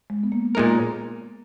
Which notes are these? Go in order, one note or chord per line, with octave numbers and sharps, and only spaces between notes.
G#3
B3
A#3
A#2 G#3 A#3 D#4 A#4